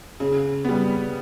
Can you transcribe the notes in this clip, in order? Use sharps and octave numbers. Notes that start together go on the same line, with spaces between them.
C#3
G3 B3